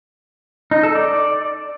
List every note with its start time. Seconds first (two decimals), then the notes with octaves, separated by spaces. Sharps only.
0.71 D#4
0.83 A4
0.95 D5